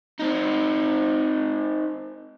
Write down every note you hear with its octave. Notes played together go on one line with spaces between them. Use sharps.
C4 D#4